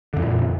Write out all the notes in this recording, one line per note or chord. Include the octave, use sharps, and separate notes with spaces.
F2 A#2 D3 E3